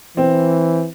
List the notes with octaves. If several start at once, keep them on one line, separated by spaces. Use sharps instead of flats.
E3 C4